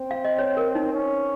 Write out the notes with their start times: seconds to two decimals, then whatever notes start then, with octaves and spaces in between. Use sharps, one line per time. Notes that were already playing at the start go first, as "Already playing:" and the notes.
Already playing: C4
0.11 F5
0.24 D#5
0.39 C#5
0.57 A#4
0.75 D#4
0.93 C#4